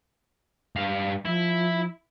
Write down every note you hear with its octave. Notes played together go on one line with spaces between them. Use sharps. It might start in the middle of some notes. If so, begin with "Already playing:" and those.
G2 F5
F3 E4